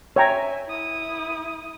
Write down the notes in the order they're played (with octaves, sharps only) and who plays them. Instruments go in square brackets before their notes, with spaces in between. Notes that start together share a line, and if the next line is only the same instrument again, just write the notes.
[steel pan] C#5 G5 A#5 [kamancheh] E5 G#5
[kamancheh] E4 D#6